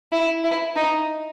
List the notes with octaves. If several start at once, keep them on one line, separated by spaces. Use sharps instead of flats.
E4
E4
D#4